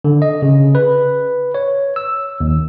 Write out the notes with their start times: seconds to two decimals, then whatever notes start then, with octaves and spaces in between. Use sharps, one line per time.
0.04 D3
0.22 D#5
0.42 C#3
0.75 B4
1.55 C#5
1.96 E6
2.40 D#2